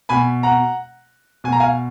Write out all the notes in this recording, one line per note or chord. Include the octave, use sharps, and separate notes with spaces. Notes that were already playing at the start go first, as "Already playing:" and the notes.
B2 G#5 B5
F#5 A#5
B2 G#5
A#5
F5 G#5